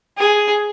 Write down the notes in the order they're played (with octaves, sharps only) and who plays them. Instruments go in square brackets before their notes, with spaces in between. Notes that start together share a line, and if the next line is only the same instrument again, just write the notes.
[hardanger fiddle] G#4